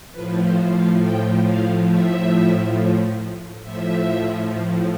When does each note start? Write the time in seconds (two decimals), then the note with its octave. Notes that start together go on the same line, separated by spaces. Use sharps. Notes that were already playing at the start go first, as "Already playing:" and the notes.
0.13 A2 F3 B4
0.42 C5
0.72 F5
1.01 G5
1.44 F5
1.88 E5
3.63 A2 F3 E5